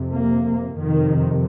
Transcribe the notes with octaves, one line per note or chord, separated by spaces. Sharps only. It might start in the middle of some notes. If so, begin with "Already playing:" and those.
Already playing: F2 C3
A#3
F2 C3 D#3